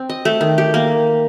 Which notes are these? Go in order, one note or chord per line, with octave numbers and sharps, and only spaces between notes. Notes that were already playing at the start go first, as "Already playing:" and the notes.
Already playing: C4
D#5
A3
D#3
G4
A#3